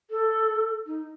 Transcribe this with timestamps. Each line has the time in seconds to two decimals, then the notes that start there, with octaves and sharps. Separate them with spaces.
0.10 A4
0.87 D#4